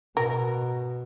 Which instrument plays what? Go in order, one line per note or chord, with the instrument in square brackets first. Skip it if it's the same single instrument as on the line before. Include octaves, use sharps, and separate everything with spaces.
[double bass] B2 [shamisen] A#4